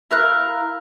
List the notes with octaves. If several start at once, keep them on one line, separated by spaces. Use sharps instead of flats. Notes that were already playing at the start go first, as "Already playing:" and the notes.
E4 A#4 F5 F#6